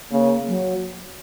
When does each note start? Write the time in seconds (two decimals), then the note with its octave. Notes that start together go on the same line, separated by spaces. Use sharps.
0.11 C#3 A#3
0.48 F#3